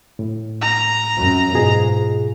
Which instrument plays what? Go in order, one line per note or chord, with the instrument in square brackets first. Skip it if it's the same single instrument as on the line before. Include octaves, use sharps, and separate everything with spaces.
[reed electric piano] A2
[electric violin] A#5
[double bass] F#2
[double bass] G#2 [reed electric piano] B2 F4 G#4